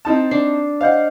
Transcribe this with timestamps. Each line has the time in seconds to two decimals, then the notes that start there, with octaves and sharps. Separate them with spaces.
0.05 C4 D#4 A5
0.31 D4 C7
0.81 C5 D#5 F5 F#5 G6